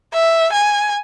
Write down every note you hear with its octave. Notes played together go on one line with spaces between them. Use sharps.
E5
G#5